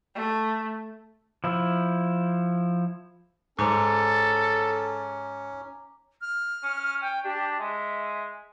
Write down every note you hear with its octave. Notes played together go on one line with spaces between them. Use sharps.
A3
F3 E4
G#2 C#4 A4 A#5 D6
F6
C#4
G5
D4 G4
G#3 E5